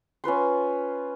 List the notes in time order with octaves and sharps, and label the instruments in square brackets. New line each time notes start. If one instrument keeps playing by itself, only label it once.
[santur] C#4 F4 B4 C6